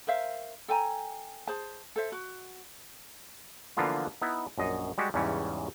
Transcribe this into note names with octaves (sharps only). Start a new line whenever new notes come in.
A#4 C5 E5 F5
A4 G5 G#5 A#5
G#4 C5 A5
A4 C5 E5
F#4
D3 E3 F3 A#3 B3 F4
B3 D#4 E4
A#1 F#2 D#5
G3 G#3 F#4 G4
E2 G#2 C#3 E3 G3 C#4